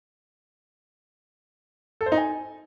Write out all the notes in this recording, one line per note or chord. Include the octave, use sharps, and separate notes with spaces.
A4
C5
D#4
G#5